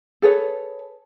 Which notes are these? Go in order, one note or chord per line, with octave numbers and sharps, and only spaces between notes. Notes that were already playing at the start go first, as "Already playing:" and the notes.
G#4 A4 B4 C#5